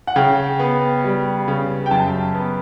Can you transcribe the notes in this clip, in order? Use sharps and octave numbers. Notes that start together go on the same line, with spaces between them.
F#5
C#3 G5
B3
G3
C#3
G5
F#2 A5
B3